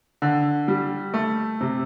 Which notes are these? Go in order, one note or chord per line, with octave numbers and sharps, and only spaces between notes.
D3
G3
A3
C3